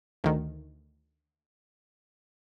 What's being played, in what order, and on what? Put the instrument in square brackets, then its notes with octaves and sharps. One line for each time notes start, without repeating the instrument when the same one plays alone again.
[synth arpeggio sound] D2 D#3